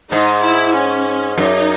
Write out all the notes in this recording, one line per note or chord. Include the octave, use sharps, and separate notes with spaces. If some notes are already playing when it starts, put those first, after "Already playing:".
G#2 D#4
E4
C#4
F#2 D#4